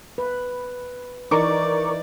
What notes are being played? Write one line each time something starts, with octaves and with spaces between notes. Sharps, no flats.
B4
E3 D#4 A#4 D5 C#6 D6